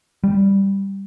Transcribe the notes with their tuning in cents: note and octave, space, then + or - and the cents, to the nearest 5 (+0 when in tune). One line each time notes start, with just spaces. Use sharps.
G3 +5